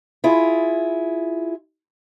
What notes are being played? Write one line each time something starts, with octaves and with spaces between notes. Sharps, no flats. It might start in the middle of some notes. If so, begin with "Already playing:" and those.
E4 F4 G#4